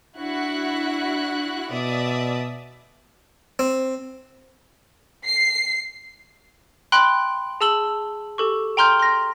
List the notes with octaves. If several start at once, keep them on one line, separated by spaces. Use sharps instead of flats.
D4 E4 F#4 F#6
B2 D5 E5 D#6
C4
C7
G5 B5 C6 F#6
G#4 A5 E6 F#7 G7
G4 A4 C#6
G5 A#5 C6 F6 G6
C6 A#6